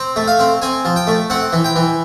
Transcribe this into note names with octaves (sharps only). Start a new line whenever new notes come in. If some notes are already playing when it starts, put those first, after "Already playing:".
Already playing: C4
A3
F5
C4
C4 G#5
F3
G5
A3
C4 F#5
E3
G5
E3